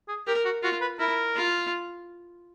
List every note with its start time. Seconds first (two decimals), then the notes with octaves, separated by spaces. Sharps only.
0.08 G#4
0.27 G4 A#4
0.45 F#4
0.63 F4 F#4
0.81 B4
0.99 E4 A#4
1.36 F4